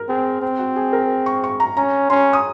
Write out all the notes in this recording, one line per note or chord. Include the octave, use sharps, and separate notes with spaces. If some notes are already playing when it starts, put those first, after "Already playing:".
Already playing: A#4
C4 G#4
C4
F#4
G#4
A#4
C#6
C#6
A#5
C#4 A#5
C#4 C6
D#6